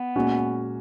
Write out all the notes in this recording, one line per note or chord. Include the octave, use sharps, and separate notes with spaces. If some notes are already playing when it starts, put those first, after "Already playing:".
Already playing: B3
A#2 G#3 C#4 F#4